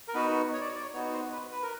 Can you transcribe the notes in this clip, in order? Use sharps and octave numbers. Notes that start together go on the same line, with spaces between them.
A#4
B3 D#4 F#4 B4
C#5
D5
C#5
D5
C#5
B3 D#4 F#4 C#5
C5
B4
B4
A#4